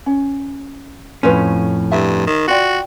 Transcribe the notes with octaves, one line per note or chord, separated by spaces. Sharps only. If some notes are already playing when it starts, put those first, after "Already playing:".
C#4
F2 A2 C#4 F4 B4
G2 E5
D#3
F4 F#4 D5 G5